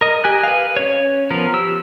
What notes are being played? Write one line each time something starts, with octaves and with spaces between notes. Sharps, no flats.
A#4 D#5
G4 G#5 F#6
B4 F5
C#4 C#5
F3 B3 A#4
G4 E6